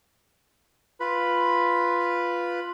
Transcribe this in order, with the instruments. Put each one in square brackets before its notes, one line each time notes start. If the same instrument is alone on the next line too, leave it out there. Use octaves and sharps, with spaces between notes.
[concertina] F4 B4 B5